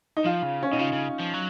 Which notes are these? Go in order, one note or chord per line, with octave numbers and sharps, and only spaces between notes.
D#4
F3 F4
C#3
C#4
B2 D#4
C#3 F4
C#3
F3
F#3